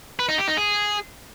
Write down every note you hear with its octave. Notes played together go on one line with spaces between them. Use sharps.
B4
D#4
G4
D#4
G#4